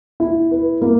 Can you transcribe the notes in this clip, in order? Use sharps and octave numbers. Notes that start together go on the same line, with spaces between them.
E4
B4
A#3